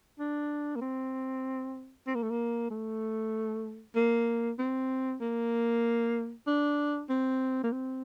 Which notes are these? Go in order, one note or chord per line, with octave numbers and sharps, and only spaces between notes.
D4
A#3
C4
C4
A#3
A3
A#3
A3
A#3
C4
A#3
D4
C4
A#3
C4